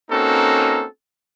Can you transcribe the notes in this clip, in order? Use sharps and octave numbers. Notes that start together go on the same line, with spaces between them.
A#3 C4 C#4 D#4 F#4 A4